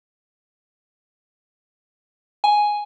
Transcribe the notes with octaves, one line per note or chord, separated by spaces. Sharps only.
G#5